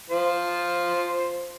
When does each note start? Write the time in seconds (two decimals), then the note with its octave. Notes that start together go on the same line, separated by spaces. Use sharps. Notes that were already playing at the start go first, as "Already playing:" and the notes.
0.10 F3 C5